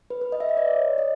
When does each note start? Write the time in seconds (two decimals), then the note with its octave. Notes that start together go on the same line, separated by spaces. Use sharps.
0.10 B4
0.21 B4
0.32 D#5
0.40 E5
0.49 D#5
0.57 D5
0.76 C#5
0.98 D#5